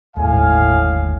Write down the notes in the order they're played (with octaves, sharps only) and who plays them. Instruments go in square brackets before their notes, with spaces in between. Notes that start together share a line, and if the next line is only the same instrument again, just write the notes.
[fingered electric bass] G1 D#2 [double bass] A2 [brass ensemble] F5 [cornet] G#5